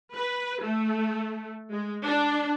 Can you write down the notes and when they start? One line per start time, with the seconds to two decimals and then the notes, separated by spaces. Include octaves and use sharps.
0.14 B4
0.61 A3
1.71 G#3
2.04 D4